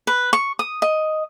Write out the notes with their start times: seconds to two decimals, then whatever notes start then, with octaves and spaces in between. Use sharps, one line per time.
0.07 B4
0.33 C#6
0.59 D#6
0.82 D#5